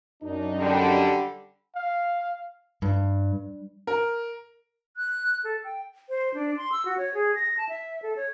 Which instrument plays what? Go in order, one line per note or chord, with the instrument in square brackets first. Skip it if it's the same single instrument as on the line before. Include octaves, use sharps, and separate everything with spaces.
[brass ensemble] F#2 D4 D#4
[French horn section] D3 G3
[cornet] F5
[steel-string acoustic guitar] G2
[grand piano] A#4
[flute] F#6
A4
G5
C5
D4
C6
E6
F#4
C#5
G#4
A#6
A5
E5
A4
C#5